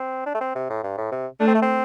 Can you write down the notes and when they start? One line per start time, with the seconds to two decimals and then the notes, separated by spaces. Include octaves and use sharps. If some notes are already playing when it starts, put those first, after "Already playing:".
Already playing: C4
0.26 D4
0.34 A3
0.41 C4
0.55 C3
0.70 A2
0.83 G2
0.98 A2
1.12 C3
1.40 A3 D4
1.47 C4
1.55 A3
1.62 C4